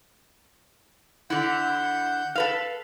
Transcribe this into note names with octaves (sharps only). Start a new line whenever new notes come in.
D3 E4 F#5 G6
A4 B4 F5